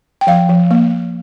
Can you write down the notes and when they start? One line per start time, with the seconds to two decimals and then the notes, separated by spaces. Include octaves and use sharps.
0.21 G5
0.27 F3 F5
0.49 F3
0.71 A#3